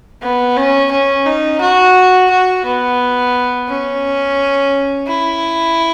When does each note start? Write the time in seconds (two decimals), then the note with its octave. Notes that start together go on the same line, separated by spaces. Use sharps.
0.22 B3
0.56 C#4
0.91 C#4
1.26 D#4
1.61 F#4
2.30 F#4
2.65 B3
3.68 C#4
5.07 E4